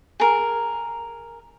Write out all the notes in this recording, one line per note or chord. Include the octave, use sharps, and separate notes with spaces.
G#4 A#4